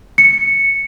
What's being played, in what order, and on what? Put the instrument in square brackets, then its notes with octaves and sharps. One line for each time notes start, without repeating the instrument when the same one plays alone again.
[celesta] C#7